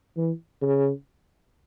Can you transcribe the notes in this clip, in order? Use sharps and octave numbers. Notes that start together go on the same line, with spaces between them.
E3
C#3